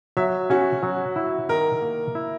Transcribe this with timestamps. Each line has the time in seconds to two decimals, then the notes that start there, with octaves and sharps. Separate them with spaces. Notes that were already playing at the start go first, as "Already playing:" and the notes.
0.17 F#3 E5
0.50 C#4 F#4
0.83 F#3
1.16 E4
1.49 D#3 A#4
1.82 A#3
2.15 E4